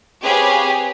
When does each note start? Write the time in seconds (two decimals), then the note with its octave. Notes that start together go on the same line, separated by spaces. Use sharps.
0.22 C4 G4 G#4 B4 C#5 F5